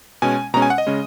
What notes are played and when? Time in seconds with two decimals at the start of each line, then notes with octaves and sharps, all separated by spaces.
0.22 B2 G#3 C#4 G#5
0.54 B2 G#3 C#4 A#5
0.62 G#5
0.70 F#5
0.78 D#5
0.87 C#3 G#3 C#4